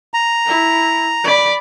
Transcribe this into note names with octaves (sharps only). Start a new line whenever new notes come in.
A#5
E4
D5 B5